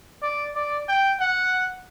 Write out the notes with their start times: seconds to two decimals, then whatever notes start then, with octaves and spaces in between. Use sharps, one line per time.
0.22 D5
0.55 D5
0.89 G5
1.20 F#5